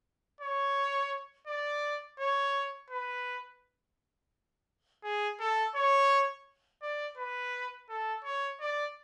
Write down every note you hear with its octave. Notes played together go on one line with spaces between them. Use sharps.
C#5
D5
C#5
B4
G#4
A4
C#5
D5
B4
A4
C#5
D5